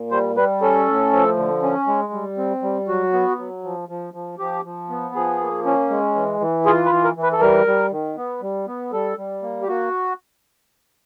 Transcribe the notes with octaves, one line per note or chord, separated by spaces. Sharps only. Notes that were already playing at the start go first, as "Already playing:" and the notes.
Already playing: A#2
G3 C5
G3 B4
C#4 A4
A2
F3
D3
C#4
G#3
G3
C4
G3
F#3 F#4
B3
F#3
F3
F3
F3
F3 G4
F3
B3
F3 G#4
A#3
C#4
G#3
E3
E3
F4 G#4
B4
E3
A#4
E3
B4
A4
G3 A#4
G3
D#3
B3
G3
B3
G3 A4
G3
A#3
G4
A#3 F#4